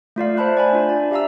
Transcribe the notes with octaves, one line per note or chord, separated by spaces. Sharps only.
A3 F4 D5 F5
C5 E5 A5 B5 F#6
D5 G#5 B5
D4 F4
D5
G4 E5 F5 A#5 E6